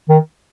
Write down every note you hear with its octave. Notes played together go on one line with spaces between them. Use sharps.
D#3